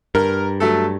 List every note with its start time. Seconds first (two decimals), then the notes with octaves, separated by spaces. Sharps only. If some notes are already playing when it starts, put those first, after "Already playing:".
0.15 G2 A#4
0.60 F#3 A3 A4